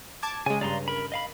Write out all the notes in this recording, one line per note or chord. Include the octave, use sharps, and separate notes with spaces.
A5 D6 G#6
C#3 G#3 G#5
G2 C#3 D5 A#5 C6
A#4 B5
D#5 F5 B5